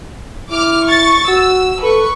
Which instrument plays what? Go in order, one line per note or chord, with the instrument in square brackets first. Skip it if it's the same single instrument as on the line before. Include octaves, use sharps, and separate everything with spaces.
[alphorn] E4 [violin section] D6 F6
[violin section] C#6 A6
[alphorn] F#4 [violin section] E6
[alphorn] A4 [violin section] B4 C#6